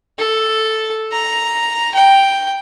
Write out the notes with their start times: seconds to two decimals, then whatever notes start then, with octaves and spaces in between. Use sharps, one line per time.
0.19 A4
1.12 A#5
1.94 G5